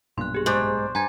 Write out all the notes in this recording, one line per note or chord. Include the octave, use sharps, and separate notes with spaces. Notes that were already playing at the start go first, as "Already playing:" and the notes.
B1 G2 A#2 C6 F#6
G4 G#4
G#2 C5 D5 C#6 F#6
G2 G#5 A#5 G#6